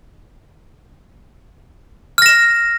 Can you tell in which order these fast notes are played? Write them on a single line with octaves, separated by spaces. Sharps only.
F6 A#6 E7